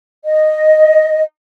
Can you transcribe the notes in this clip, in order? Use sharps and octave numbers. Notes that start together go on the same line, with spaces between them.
D#5